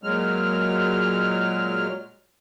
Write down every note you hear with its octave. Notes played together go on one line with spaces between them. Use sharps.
A#2 F#3 G#3 F6